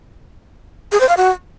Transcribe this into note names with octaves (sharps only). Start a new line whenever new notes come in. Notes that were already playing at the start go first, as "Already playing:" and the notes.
G#4
C5
F5
F#4